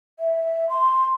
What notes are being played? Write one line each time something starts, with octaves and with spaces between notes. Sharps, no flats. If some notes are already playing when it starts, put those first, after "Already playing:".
E5
C6